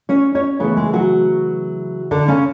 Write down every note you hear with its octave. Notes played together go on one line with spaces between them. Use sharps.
C#4 C#5
C#4 C#5
C#3 E3 A3 B3 B4
G#3 G#4
F#3 F#4
D3 D4
C#3 C#4